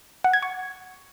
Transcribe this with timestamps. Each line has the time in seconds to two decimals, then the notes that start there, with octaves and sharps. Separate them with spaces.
0.24 F#5
0.33 G#6
0.42 C#6